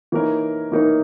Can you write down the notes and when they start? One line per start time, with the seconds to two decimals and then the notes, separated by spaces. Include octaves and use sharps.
0.12 E3 A#3 D#4 A#4 C#5
0.72 E3 A#3 D#4 A#4 C#5